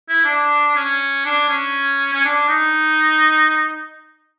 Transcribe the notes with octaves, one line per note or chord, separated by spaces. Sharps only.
E4
D4
C#4
D4
C#4
C#4
D4
D#4